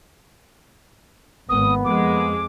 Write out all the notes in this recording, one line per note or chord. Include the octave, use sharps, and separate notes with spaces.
G#1 A#3 B3 D#6
F2 G#3 D6